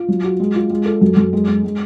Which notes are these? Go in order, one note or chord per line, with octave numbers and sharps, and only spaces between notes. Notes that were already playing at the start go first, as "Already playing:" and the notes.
Already playing: F4
F#3
F#4
G#3
F4
G#3
A4
F#2
F#2
G#3
G#3
G#3